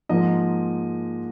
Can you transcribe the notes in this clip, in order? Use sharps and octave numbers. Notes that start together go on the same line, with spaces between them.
G#2 F3 A#3 D#5